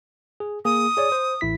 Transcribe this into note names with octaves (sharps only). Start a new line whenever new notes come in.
G#4
A#3 G#4 D#6
G#4 C#5 D5
C5
A1 E4 B6